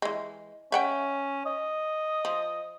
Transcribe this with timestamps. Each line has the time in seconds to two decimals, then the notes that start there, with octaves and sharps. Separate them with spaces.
0.02 E3 G#3
0.72 C#4 E5 F#5 G5
1.46 D#5
2.25 F3